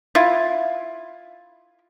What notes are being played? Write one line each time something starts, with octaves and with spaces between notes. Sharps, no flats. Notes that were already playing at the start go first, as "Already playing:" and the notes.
E4 F4